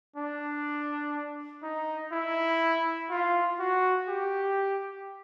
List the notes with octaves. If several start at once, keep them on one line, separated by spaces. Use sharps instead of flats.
D4
D#4
E4
F4
F#4
G4